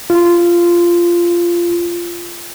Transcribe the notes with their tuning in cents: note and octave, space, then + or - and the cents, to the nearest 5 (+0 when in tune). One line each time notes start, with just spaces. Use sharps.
F4 -15